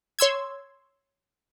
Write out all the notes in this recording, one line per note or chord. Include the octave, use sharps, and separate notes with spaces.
C#5 C6 E6 G#6